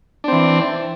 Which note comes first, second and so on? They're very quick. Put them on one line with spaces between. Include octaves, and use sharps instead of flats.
D4 C4 E3